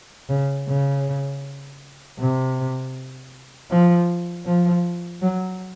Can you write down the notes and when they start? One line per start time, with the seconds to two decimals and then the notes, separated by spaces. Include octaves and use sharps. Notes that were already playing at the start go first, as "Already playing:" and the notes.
0.29 C#3
0.68 C#3
2.19 C3
3.70 F3
4.46 F3
5.22 F#3